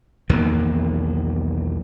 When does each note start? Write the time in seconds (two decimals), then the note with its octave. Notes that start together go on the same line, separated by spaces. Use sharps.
0.29 B1 E2 D#3 A#3